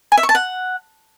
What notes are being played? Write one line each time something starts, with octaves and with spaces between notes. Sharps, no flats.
G#5
E5
C#6
A5
F#5